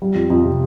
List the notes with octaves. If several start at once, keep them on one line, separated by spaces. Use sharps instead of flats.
G3
F2
F2
C3